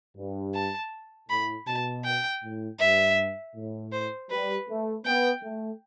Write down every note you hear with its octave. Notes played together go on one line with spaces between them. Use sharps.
G2
A5
A2 B5
B2 A5
G5
A2
G2 E5
A2
C5
G3 B4
A3
B3 G5
A3